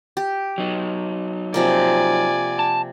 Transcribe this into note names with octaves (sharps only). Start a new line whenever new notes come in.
G4
F#3 D#4
C3 F3 A#3 D5 G#5
A5